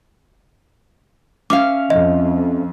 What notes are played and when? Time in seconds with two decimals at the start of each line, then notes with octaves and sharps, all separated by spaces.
1.50 C#4 E5 F5 D6
1.90 F2 D#5